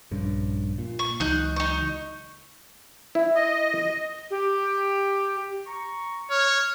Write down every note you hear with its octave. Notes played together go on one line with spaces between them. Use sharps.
A#1 G2 C#3
A#2
C#6
C#2 E3 F#3 D#4 F#6 G6
D#4 C#6
E4
D#5
G4
A#5 C#6
C#5 F6